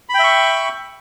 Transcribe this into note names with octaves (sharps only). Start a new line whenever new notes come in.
E5 G5 B5 C#6